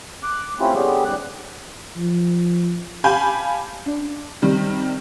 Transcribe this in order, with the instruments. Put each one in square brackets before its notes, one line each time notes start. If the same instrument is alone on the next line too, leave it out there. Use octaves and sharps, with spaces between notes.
[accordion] D6 F#6
A3 C4 C#4 E4 F4 G4
D3 G3 B3 C#4 G4 G#4
E2 G#2 G3 G4 F#6
[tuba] F3
[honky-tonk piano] G4 F5 G#5 A5 B5 G6
D4
C3 D#3 G3